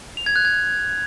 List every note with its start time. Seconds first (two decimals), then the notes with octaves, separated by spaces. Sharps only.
0.17 F7
0.26 G#6
0.36 F#6
0.45 G#6